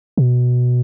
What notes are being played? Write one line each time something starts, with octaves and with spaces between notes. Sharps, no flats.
B2